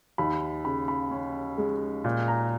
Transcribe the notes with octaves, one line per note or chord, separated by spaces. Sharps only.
D#2 B5
C#3 B5
B5
C#4
G#3
A#2
A#5